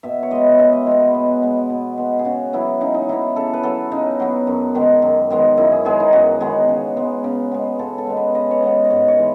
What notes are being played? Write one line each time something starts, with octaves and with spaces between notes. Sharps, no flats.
B2 E5
C#5
G#3 B3 D#5
B2 E5
D#5
G#3 B3 C#5
B4
B2
G#3 B3
B2
G#3 B3
G#4
C#3 F#4
F#3 B3 E4
C#3 D#4
D#4
F#3 B3 E4
C#3 A4
B4
F#3 B3 A4
C#3 D#4
F#3 B3
F#2
D#3 G#3 B3
F#2
D#3 G#3 B3
F#2 E4
G#4
D#3 G#3 B3 G#4
D#4
F#2 F#4
D#3 G#3 B3 G#4
C#3
G#3 B3
C#3
G#3 B3
C#3 A4
A4
G#3 B3
B4
C#3 D#5
C#5
G#3 B3 D#5
D#5
G#2 C#5
C#5
E3 G#3